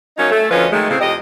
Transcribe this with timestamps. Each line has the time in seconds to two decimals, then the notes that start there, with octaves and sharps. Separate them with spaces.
0.18 F#3 A#3 C#4 D#4
0.31 A3
0.51 D2 F3 C#4 B4 D#5
0.72 D#3 G#3 A3
0.90 A2 C#3 C4
1.01 F2 G4 D#5